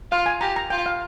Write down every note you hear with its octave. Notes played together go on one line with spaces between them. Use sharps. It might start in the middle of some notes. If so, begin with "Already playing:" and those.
F4 F5
G#5
G4 A#5
A#5
F4 G5
F5